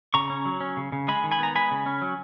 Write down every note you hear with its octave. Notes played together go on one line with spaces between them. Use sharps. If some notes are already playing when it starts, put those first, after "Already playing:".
C#3 A#5 C#6
C#4
F#3
C#4
C#3
C#3
G#3 G#5 B5
D#3
G#5 B5
B3 A#5
G#3 G#5 B5
C#3
C#4
F#3